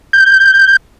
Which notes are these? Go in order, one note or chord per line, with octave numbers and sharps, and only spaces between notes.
G6